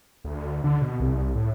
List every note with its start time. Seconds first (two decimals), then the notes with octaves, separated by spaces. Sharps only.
0.25 D2
0.64 D3
0.81 B2
1.00 C2
1.35 A2